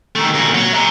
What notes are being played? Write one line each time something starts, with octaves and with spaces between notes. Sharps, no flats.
D#3 A3
A#2 F#4
F#3
E5 A#5